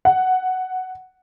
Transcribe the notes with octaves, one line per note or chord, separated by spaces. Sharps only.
F#5